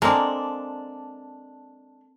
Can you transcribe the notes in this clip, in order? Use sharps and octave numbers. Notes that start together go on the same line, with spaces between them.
G#3 A#3 C4 D4 A4